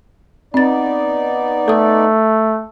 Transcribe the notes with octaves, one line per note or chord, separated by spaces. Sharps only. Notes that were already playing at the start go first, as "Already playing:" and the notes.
B3 C4 D#4 D5 A6
A3 A4 D#6